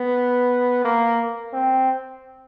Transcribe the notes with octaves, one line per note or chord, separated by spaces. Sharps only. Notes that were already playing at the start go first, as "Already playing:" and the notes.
Already playing: B3
A#3
C4